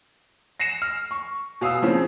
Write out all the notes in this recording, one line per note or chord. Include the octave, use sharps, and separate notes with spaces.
A#6 C7 C#7 E7
F6
C#6
B2 F5 D#6 E6
C#3 F3 C4